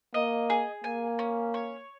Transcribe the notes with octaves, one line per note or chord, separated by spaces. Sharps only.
A#3 D#5
G#4
A#3 G#5
C#4
C#5